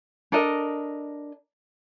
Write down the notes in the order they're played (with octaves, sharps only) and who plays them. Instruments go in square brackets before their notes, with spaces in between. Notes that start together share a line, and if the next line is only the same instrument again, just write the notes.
[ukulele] D4 A4 A#4 D#5